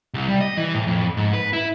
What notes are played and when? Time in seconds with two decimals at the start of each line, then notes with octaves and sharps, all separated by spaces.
0.14 C2
0.28 G3
0.41 D#5
0.57 E3
0.74 A2
0.87 F2
1.17 G#2
1.34 B4
1.53 E4